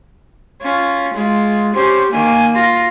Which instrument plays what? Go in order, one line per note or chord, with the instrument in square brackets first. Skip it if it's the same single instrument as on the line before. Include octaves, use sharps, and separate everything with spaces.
[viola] C#4 F4
G#3 F4
[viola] C#4 G4 [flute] C5
[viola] D#3 A#3 [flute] G#5
[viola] F4 [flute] A#6